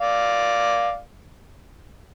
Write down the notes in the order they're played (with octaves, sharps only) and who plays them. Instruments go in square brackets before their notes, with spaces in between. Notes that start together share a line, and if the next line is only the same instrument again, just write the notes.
[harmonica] D5 F5